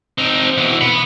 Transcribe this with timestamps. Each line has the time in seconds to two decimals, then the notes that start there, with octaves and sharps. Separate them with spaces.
0.18 C4 D#4
0.57 B2 E3
0.81 F#5 B5